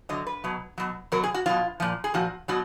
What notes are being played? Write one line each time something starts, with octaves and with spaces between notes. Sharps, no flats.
D3 F#3 D#5
B4
B2 F#3
B2 F#3
B2 F#3 A#4
G#4
F#4
B2 F#3 F4
A#2 F3
G#4
A#2 F3 F#4
B2 F#3 F#4